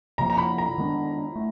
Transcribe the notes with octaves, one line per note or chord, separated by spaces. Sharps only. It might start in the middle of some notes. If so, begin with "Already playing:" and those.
C3 F3 A#3 A#5
A#5
B5
A#5
D#3 G#3 B3 D4
A3